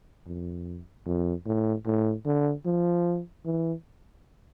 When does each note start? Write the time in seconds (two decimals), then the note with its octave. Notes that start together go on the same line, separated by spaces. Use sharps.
0.27 F2
1.06 F2
1.46 A2
1.86 A2
2.25 D3
2.66 F3
3.45 E3